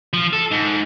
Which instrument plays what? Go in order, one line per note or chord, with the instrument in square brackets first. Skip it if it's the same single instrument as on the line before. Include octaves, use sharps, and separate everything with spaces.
[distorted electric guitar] F3
A4
G#2